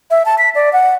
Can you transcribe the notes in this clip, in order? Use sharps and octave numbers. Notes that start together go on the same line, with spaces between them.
E5
A5
B6
D5
F#5